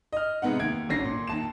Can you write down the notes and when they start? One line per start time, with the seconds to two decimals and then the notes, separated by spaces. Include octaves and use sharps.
0.13 D#5 F6
0.42 C3 G#3 B3 D#4 F#5
0.59 D#2 G#6 D7
0.89 G#1 D3 C#4 A#6 C7
1.05 A#2
1.28 D#2 A5 E7